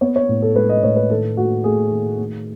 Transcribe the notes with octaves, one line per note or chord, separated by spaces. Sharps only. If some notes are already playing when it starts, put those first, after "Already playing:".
B3 C#5
C#5
A2
A4
G#3 B4
D#5
A2 C#5
B4
D#3 A4
A3 F#4
A3 G#4
D#3
A3